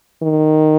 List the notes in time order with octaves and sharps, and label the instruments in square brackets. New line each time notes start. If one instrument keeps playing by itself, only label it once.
[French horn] D#3